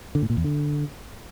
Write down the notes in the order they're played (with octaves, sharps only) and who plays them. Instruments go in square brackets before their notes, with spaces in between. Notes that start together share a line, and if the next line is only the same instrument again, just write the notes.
[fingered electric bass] D3
A2
A#2
E2
D3